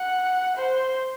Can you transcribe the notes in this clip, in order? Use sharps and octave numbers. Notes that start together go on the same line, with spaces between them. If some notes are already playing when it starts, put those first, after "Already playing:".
Already playing: F#5
C5